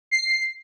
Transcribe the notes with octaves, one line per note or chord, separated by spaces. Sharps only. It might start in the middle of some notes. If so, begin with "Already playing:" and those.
C7